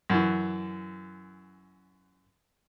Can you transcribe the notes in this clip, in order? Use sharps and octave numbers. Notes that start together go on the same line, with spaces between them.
F#2 E3